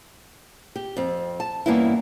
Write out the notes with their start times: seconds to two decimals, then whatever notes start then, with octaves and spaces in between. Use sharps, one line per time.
0.76 G4
0.97 F2 C4
1.40 A5
1.66 G2 E3 A#3 B3 C#4 E4